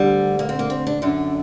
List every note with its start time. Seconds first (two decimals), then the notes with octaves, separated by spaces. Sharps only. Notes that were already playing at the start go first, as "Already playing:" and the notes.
Already playing: D2 D3 G3
0.39 A#3
0.49 C4
0.59 A#3
0.70 C4
0.87 D4
1.02 F#2 D3 D4